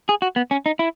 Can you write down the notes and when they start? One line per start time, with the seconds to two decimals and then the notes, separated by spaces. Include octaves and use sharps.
0.09 G#4
0.22 F#4
0.36 B3
0.51 C#4
0.66 D#4
0.79 E4